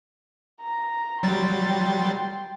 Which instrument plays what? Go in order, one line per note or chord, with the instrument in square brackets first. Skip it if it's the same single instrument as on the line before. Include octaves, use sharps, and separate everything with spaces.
[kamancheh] A#5
[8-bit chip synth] F#3 G3 A6 [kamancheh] G5 C6